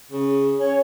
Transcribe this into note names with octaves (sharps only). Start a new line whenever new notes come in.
C#3
C#4 C#5